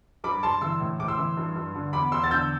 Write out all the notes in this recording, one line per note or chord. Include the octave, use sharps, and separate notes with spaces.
G2 B5 D6
G2 A5 C6
E3 C6 E6
A2
A2 D6
C6 E6
E3
G2
G2
D3
E2 B5 D6
E2 C6 E6
A6
D3 E6 G6